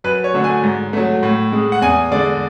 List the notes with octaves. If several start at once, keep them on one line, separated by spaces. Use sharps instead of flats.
F#2 B4
C#5
D3 F#3 A3
G#5
G#2
F#3 A3
A2
G#3
F#5
E2 G#5
D3 G#3 D5